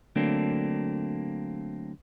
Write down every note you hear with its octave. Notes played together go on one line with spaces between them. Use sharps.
D3 F#3 A3 A#3 C4 D4